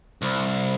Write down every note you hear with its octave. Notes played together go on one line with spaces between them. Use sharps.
C2